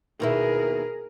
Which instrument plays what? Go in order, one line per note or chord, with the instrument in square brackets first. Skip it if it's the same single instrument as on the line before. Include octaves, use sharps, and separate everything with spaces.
[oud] D#2 B2 E4 [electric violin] G#4 A#4